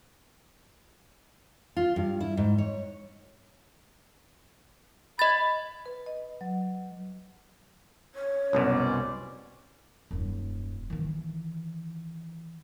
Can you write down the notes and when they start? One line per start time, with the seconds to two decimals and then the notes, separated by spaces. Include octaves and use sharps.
1.77 F4
1.96 G2
2.20 E4
2.37 G#2
2.58 C#5
5.19 D#5 B5 A6
5.86 B4
6.06 D#5
6.41 F#3
8.15 C#5
8.53 C2 F#2 B2 C#4 C5 D5
10.11 D#1 F#2
10.90 D#3 E3